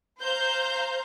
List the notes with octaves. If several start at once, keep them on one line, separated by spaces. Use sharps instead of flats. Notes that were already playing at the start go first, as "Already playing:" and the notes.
C5 F5 A#5 G6